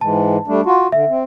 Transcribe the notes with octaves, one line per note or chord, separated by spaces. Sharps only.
G#2 E3 G#3 A5
G3 A3 D4
F4 F#4
D3 E5
C4